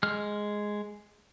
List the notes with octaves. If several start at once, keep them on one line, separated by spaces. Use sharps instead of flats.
G#3 F6